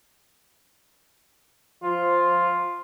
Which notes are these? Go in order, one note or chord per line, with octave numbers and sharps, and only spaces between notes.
F3 F4